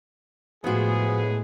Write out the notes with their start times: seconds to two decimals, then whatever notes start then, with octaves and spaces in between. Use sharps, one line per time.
0.64 A2 F3 G#3 B3 F#4 G#4